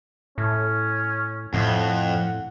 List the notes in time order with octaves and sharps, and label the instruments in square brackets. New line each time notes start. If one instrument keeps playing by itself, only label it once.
[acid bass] A2 [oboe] C#4
[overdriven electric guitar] F2 [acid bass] A2 [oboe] F#5